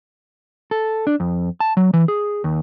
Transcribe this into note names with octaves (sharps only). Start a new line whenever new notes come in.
A4
D4
F2
A5
F#3
E3
G#4
D#2